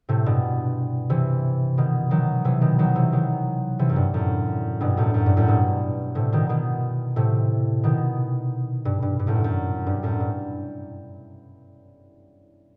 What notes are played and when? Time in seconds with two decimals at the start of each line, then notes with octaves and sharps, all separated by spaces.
0.09 A2 C3
0.26 G2 B2
1.10 C3 E3
1.78 B2 D#3
2.11 D#3 F#3
2.44 C3 E3
2.61 B2 D#3
2.79 D#3 F#3
2.95 C3 E3
3.12 D#3 F#3
3.79 C3 E3
3.89 F#2
3.96 G2
4.14 F#2 A2
4.81 G2 B2
4.97 F#2 A2
5.14 F#2
5.26 G2
5.37 F#2 A2
5.48 G2 B2
6.15 A2 C3
6.33 B2 D#3
6.49 B2 D#3
7.16 A2 C3
7.84 B2 D#3
8.85 G2
9.02 G2
9.19 G2
9.27 F#2 A2
9.36 G2
9.44 F#2
9.86 G2
10.03 F#2 A2
10.20 G2